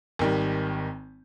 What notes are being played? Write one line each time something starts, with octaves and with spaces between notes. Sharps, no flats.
G#1 D#3 G3